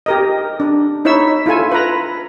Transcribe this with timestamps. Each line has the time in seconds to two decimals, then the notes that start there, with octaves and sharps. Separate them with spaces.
0.06 G4 A#4 D#5
0.60 D4
1.05 D#4 E4 C#5 E5 E6
1.46 E4 F4 A4 G#5
1.72 B4 A#5